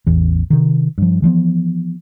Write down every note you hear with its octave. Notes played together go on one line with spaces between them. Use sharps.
A1 E2 E3
C3 D#3
G2 F3
E3 F3 G#3 B3